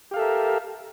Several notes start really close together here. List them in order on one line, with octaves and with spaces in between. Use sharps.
G4 F5 A4 E5 A#4